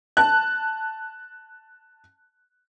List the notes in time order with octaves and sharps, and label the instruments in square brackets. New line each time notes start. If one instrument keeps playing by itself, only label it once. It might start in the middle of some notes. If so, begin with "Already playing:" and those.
[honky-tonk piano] A5 F#6